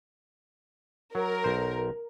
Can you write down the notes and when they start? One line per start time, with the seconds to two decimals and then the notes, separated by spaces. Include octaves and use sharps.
1.15 F#3 A#4
1.44 B1 C5